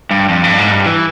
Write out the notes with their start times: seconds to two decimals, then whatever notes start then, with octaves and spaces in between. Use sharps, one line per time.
0.11 G2
0.29 F2
0.44 G2
0.58 G#2
0.72 G2
0.86 E3